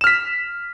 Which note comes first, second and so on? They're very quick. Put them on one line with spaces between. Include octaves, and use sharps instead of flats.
E7 F6 B6